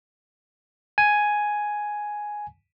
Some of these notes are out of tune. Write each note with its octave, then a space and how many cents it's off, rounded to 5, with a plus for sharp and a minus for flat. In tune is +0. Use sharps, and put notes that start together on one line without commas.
G#5 +5